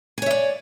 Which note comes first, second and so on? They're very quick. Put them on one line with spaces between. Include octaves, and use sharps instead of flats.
G#5 C#5 E5 D5